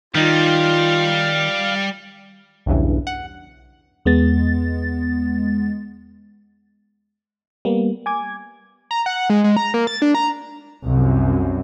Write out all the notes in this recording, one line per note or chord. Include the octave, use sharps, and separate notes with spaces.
D#3 G3 D#4 F4 F5
B1 E2 G2 C#3 E3
F#5
E2 G#3 B3 A6
G3 A#3 B3
G#5 D6 G#6
A#5
F#5
G#3
G#3
A#5
A#3
A6
D4
A#5
C2 F#2